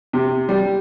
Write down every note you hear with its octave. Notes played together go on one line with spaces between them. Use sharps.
C3
G3